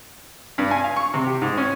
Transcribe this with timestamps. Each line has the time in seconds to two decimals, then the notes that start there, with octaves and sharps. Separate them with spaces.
0.58 G2
0.71 G#5
0.84 F5
0.96 C#6
1.14 C3
1.26 G4
1.42 G#2
1.57 C#4